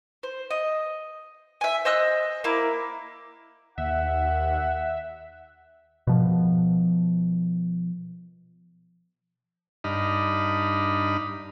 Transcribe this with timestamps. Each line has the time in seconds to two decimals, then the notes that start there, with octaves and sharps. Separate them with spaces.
0.23 C5
0.50 D#5
1.61 E5 G#5
1.85 C5 D#5 E6 F#6
2.44 A#3 E4 D6
3.78 D#2 E5 F#5
6.07 B2 F3
9.84 G2 D4 D#4 D#5 B5 F6